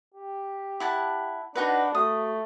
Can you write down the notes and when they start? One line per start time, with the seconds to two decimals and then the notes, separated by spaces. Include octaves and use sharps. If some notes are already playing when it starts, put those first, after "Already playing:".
0.14 G4
0.80 E4 F#5 A5
1.56 D4 D#4 F#4 B4 F#5
1.95 A3 F#4 D#6